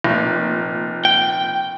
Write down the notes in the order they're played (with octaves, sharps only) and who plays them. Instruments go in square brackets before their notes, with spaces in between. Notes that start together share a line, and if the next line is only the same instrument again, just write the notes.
[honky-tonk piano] F1 A#2
[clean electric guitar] G5